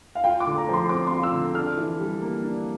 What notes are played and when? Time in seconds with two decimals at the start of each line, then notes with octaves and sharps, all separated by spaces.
0.15 F5
0.24 F4 G5
0.40 D6
0.46 D3
0.58 A#5
0.69 F3 C6
0.89 C4 D6
1.07 C6
1.12 F4
1.23 E6
1.33 D3
1.55 D4 F6
1.77 E3
1.99 G3
2.21 A#3
2.43 D4